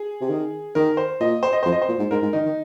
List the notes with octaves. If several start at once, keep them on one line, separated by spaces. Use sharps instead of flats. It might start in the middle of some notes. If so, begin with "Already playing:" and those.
Already playing: G#4
C3
D#3
D#3 A#4
C5
A#2 D#5
C5
D#5
F2 C5
D#5
C5
A#2
G#2
G#2 A#4
G#2
D#3 D#4
D#3